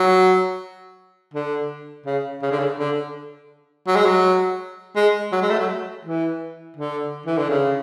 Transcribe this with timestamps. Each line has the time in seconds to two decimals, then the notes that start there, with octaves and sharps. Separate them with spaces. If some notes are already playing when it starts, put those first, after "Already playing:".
Already playing: F#3
1.34 D3
2.06 C#3
2.42 C#3
2.52 D3
2.59 C#3
2.79 D3
3.87 F#3
3.96 G#3
4.06 F#3
4.96 G#3
5.32 F#3
5.42 G#3
5.50 A3
5.59 F#3
6.05 E3
6.77 D3
7.26 E3
7.38 D3
7.49 C#3